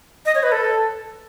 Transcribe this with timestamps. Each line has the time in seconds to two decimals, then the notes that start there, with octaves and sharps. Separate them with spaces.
0.26 D#5
0.35 C#5
0.43 B4
0.52 A4